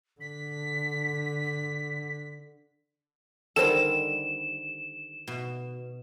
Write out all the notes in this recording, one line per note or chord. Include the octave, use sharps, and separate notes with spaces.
D3 B6
D3 D#3 G3 A4 A#4 C5 E7
B2